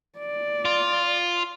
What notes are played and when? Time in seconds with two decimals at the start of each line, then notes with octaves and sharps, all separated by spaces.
0.19 D5
0.65 F4